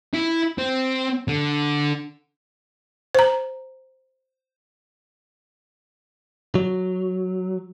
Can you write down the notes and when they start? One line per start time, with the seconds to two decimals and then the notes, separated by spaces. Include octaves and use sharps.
0.14 E4
0.58 C4
1.28 D3
3.15 C5 A#5
6.55 F#3